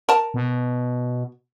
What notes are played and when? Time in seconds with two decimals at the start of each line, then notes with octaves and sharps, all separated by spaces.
0.09 A#4 A5
0.34 B2